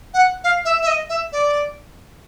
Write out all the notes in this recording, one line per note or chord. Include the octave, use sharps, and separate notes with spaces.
F#5
F5
E5
E5
D#5
E5
D5